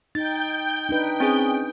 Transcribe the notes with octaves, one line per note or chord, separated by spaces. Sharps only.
D#4 G5 G6 A6
D4 D#4 B4
C4 C#4 G#4